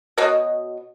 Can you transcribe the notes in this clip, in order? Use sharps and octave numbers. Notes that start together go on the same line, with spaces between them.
B2 F#4 C#5 D#5